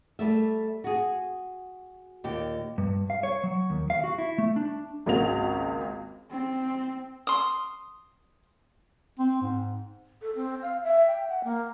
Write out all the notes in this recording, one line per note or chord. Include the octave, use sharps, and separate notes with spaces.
G3 A3 E5
F#4 G#4
D#2 A#2 G4
G2
F5
C#5
F#3
D#2
F5
F#4
E4
A3
D4
G#1 C#2 A#3 F#4 F7
C4
C6 D#6
C4
G#2
A4
C4
F5
E5
G5
F#5
A#3